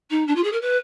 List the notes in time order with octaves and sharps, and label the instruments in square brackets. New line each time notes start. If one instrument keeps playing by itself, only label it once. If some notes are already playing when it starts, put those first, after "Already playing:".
[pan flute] D#4
D4
F4
G#4
A#4
B4